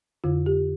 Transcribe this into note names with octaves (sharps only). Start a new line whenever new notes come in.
F2 D3 F4
G4